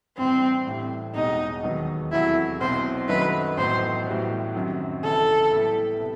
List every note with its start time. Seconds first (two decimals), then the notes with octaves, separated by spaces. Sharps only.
0.17 A1 G2 E3 C4
0.67 A1 A2 G3
1.15 E1 E2 B2 G3 D#4
1.63 E1 D#2 D#3 F#3 B3
2.12 E2 C3 F#3 A3 E4
2.61 B1 B2 F#3 C4 E4 C5
3.09 F#2 D#3 F#3 A3 D#4 B4
3.58 A1 A2 F#3 B3 D#4 C5
4.06 A1 A2 G3 B3 F#4
4.55 F#2 D#3 F#3 C4
5.04 F#1 F#2 E3 A4
5.52 A2 G3 B3 E4 G4
6.00 C3 B3